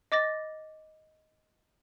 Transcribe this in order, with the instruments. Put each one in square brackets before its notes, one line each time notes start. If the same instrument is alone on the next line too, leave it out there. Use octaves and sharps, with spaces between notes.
[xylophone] D#5 D6 A6 A#6